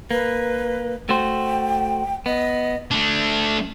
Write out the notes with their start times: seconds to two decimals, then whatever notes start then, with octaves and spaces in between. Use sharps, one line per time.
0.11 A#3 B4
1.09 A3 F#4 C5 G5
2.26 B3 D#5
2.91 A3 D4